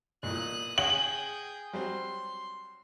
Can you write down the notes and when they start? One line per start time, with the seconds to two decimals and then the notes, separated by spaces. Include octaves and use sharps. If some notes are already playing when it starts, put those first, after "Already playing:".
0.23 B1 A#2 E3 D#6 F#6
0.78 G#4 C#5 F#5 G5 F#7
1.73 F#3 G3 C4 C6